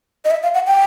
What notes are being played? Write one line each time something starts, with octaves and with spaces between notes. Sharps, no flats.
D#5
E5
F5
F#5
G5